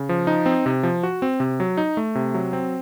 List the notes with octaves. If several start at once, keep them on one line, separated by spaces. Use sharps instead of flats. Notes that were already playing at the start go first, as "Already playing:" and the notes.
Already playing: C#3
F3
D#4
C4
C3
F3
F#4
C4
C3
F#3
D#4
A3
C3
F#3
C4